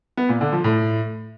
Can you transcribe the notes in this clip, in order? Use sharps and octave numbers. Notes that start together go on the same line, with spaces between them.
B3
A#2
D3
F3
A2